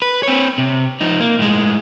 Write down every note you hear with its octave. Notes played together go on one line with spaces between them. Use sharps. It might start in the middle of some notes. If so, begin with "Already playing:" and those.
B4
C4 C#5
C3
F3 D#4
A#3
A2 G#3